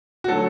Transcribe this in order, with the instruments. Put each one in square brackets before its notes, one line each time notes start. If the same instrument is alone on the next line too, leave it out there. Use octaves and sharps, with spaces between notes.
[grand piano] F#4
[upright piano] D3 F#3 A3 [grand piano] A4